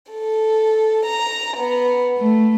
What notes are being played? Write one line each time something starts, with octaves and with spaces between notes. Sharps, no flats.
A4
A#5
B3
A3